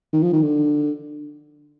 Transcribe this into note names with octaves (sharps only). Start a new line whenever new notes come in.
D#3
F3
D#3
D3